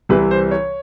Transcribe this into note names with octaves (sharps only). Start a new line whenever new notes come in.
C2 C3 E3 G3 B4
C5
C#5